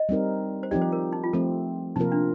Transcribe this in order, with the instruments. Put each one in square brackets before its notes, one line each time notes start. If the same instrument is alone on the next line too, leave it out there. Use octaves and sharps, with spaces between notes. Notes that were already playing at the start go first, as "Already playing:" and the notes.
Already playing: [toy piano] D#5
[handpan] G3 C4 D#4 A#4
[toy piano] C5
[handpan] F3 C4 D#4 G4 [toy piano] D5
[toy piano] C5
A#4
D#4
F4
[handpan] F3 A3 C4 [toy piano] A4
[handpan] C3 F3 A#3 F4 A#4 [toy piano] D#4
[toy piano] D4